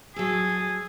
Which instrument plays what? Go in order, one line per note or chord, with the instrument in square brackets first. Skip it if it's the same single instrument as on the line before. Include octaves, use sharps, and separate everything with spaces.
[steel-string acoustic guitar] F#3 A4 [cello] G#4